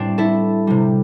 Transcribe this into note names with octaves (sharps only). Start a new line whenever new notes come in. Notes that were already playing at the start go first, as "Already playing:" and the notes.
Already playing: A2 G3 C4 D4
E4 A4
C3 G3